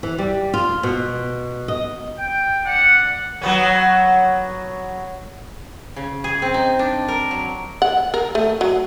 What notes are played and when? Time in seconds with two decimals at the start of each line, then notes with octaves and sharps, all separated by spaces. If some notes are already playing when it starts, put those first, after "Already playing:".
0.03 E3
0.19 G3
0.54 F4
0.83 B2
1.68 D#5
2.18 G5
2.65 D4 F#5
3.42 F#3 B3 C#4
5.96 C#3
6.24 G#4
6.42 C4
6.54 D#4
6.79 D4
7.08 A#4
7.31 F#3
7.82 F#5
8.14 A#4
8.35 A3
8.61 F#3